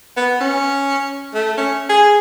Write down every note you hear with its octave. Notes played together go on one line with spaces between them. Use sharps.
B3
C#4
A3
C#4
G#4